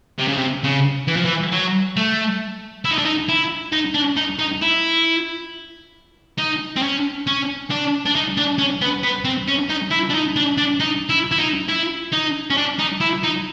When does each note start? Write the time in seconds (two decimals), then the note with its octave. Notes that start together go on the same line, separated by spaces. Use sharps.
0.18 C3
0.28 C#3
0.37 C3
0.64 C#3
1.08 E3
1.16 F3
1.25 E3
1.52 F#3
1.96 A3
2.85 E4
2.91 D#4
2.98 D4
3.05 D#4
3.29 E4
3.72 D#4
3.94 D4
4.17 D#4
4.39 D#4
4.62 E4
6.38 D#4
6.76 C4
6.82 C#4
7.27 C#4
7.70 D4
8.06 D4
8.15 D#4
8.37 D4
8.58 C#4
8.81 B3
9.03 B3
9.25 C4
9.48 C#4
9.69 D#4
9.91 E4
10.10 D4
10.14 D#4
10.36 D4
10.58 D4
10.80 D#4
11.09 E4
11.32 E4
11.38 D#4
11.69 E4
12.13 D#4
12.50 C#4
12.57 D4
12.79 D#4
13.00 E4
13.23 D#4